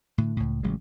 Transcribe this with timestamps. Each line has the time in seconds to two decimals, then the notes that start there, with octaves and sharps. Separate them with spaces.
0.18 A2 D3
0.37 C#2 A2
0.63 A1 C#3 F#3 G#3